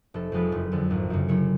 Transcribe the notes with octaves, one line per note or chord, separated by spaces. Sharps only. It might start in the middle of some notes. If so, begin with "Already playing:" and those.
F1 A4
F2 F3 G#3 B4
F#1
F2 D3
G#1
F#2 C#3
F#1 C#5